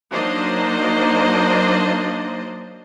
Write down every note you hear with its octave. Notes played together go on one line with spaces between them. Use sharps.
F#3 A#3 D4 D#4 C5 D#5